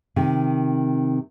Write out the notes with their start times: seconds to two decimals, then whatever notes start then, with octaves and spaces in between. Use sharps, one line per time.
0.16 C3 D#3